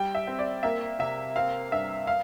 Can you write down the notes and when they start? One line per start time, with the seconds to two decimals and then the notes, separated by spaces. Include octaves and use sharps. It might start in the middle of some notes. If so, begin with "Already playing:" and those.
Already playing: G3 G5
0.15 E5
0.27 C4
0.39 D5
0.63 A#3 E5
0.99 C3 E5
1.36 C4 F5
1.71 G2 E5
2.07 F5